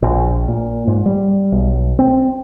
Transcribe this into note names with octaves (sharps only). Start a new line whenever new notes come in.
A#1
A#2
G#2
G3
B1
C4